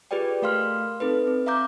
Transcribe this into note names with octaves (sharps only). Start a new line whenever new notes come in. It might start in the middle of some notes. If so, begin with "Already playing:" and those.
F4 G4 G#4 B4 D5 G5
A3 A#4 F5 C6 F6
C4 D#4 A4 B4
C4
E5 F5 A#5 D6 G6